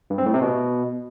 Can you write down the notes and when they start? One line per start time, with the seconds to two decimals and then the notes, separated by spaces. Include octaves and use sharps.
0.10 G2
0.18 C4
0.26 A2
0.34 C3
0.42 B2